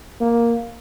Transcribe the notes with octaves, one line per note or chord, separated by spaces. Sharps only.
A#3